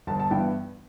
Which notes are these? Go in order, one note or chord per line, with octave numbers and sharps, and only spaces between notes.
G1 A5
A5
G2 E3 B3 E4 G5